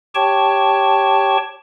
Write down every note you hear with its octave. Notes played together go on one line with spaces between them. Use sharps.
G4 C#5 G5 A5 C#6